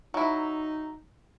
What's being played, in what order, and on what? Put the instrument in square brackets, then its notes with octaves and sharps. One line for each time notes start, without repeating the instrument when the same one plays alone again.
[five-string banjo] F#3 E4 [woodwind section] D#4